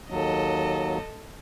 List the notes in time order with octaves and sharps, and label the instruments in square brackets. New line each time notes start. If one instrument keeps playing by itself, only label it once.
[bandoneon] D#2 F#3 [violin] A4 D#5